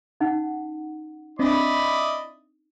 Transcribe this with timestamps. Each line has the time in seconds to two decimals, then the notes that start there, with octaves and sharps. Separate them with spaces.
0.20 C#4 D#4 F#5
1.39 C4 D4 E4 D5 D#5 B5